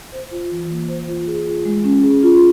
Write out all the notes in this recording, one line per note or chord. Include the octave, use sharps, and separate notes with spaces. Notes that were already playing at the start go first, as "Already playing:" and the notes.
C5
F4
E3
A#3
C5
F4
G#4
F4
G#3
C#4
G#4
F4